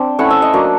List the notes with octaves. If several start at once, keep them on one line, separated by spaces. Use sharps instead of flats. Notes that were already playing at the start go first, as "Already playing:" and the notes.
Already playing: C4 D4
A3 C#4 E4 F#5
E5
D#5
F#3 A#3 D4